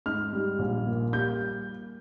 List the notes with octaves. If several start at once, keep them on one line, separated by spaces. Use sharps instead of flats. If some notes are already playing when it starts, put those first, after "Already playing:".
G#2 F6
G3
A#1
A#2
G3 G6